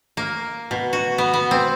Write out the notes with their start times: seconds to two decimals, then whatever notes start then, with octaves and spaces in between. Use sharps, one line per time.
0.17 A#3
0.71 B2
0.93 F#4
1.18 B3
1.33 B3
1.51 C4